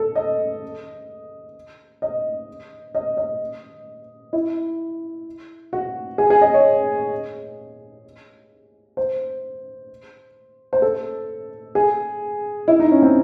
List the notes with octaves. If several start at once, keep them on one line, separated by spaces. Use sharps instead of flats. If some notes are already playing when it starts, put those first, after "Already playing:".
Already playing: A4
D#5
D#5
D#5
D#5
E4
F#4
G#4
G#4
D#5
C#5
C5
C5
A4
G#4
E4
D#4
C#4
C4